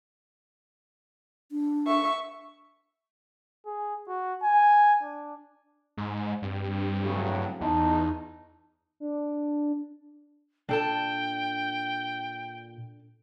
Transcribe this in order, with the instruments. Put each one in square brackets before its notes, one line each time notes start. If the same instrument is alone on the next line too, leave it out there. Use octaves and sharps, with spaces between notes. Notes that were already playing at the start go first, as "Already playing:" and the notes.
[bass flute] D4
[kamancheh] E5 C#6
[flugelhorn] G#4
F#4
G#5
D4
[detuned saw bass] G#2
[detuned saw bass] G2 [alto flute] C4
[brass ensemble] A2 C#3 F#3
[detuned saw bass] E2 [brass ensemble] D#4 [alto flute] A5
[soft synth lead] D4
[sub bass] A#2 [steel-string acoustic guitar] D4 A4 A5 [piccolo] G5